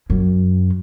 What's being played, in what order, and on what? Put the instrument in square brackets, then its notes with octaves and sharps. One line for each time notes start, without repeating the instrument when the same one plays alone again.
[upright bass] F#2